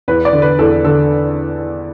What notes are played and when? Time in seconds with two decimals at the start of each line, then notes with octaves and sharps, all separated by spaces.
0.08 E2 B4
0.25 D5
0.33 D3
0.42 B4
0.59 E2 A4
0.84 D3 A4